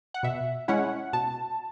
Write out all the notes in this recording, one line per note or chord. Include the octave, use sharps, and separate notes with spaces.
F#5
B2 E5
G#3 C#4 E4 F#5
B2 A5